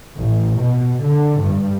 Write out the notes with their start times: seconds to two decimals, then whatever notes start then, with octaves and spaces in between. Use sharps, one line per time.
0.19 A1
0.58 B2
1.03 D3
1.43 G2